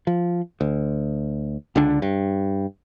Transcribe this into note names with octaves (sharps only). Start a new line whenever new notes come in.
F3
D2
C#2 D3 D4
G2